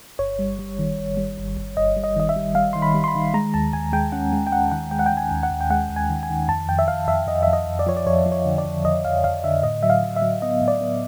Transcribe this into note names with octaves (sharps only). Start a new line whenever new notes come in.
G1 C#5
G3
G3
D#3
G1
G3
G1
G1
G1 D#5
G3
D#5
D#3 D#5
E5
G3
G3 F5
D#3 C6
B5
G3
C6
B5
D#3
G#3 A#5
D#2 A5
D#2 G#5
G#3 G5
C#4 F#5
G#3
G5
G#3 F#5
D#3 F#5
G#3 G5
F#5
G5
D#3
G#5
D#2
F#5
D#2
G5
G#3 F#5
D#2
G#5
D#3
G#5
D#3
F2 A5
F2 G5
E5
F2 F5
F2 E5
F2 D#5
F2 E5
D#5
F2
D5
F3 C#5
D5
F2 C#5
F3
C#5
D3
D5
F2
F2 D#5
F2 F5
F2 F5
D3 E5
A2 D#5
F#3 E5
F5
F#3
E5
F#3
B3 D#5
A2
D5
B3